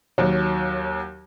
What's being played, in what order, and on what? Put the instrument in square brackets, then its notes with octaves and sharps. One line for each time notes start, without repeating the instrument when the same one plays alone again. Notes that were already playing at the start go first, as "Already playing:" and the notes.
[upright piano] D#2 F#3